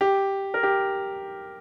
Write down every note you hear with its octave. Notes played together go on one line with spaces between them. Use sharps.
G4
A#4
G4